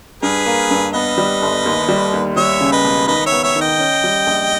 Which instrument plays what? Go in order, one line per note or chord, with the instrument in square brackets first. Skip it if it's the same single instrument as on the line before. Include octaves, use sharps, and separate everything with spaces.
[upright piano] G2 [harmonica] G#4 B4
[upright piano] A#3
G2
[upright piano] B3 [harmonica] B4 D#5
[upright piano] G3
G1
D#2
G3
D#2
[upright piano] G3 [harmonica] C#5 E5
[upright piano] C#3
[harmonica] B4 D#5
[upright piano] E1
[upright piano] D#3 [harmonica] B4 D#5
[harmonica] C#5 E5
[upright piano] B3
[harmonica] C#5 E5
[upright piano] D#3
[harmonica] D#5 G5
[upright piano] C#4
G3
A#1